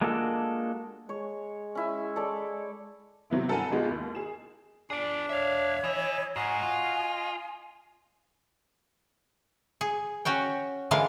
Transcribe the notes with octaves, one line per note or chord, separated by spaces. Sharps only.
G#3 A#3 D4 F4 F#4 A4
G#3 C#5
C#4 E4 G#5
A4 C#5 D5
C3 F#3 B3 E4
G2 A4 A#4 F#5 G#5 D#7
A1 G#3 B3 F4
D#2
G#4 E7
D4 G#4 D5
C#5 E5 F5
E3 D#5 E5
G#2 F#4 D#5 F5 G#5
F4
D#5
G#4
C#4 F#4 C#5 G5
D3 E3 G#3 F4 A#4 F5